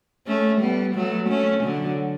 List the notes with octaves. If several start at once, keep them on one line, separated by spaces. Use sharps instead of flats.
A3 C#4
G3 B3
F#3 A3
A3 C#4
D3 F#3